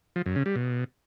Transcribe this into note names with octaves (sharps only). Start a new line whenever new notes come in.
F3
F#2
C#3
G3
B2